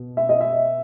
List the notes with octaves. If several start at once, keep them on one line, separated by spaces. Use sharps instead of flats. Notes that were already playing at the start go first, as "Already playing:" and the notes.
Already playing: B2
E5
D#5
E5